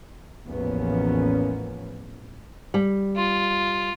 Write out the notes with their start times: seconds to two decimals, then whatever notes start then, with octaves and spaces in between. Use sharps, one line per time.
0.46 A1 E2 F3 A#3 B3 C#4
2.74 G3
3.16 F4